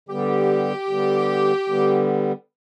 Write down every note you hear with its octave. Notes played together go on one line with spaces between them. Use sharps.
D3 G3 B3 G4
D3 G3 B3
D3 G3 B3